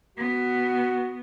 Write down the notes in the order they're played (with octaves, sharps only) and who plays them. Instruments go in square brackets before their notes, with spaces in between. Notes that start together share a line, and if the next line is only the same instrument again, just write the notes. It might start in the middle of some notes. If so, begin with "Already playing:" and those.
[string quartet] B3 [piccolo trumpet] F#4